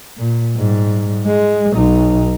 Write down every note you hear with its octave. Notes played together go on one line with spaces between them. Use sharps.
A#2
G#2 G3
G#3
B1 D#4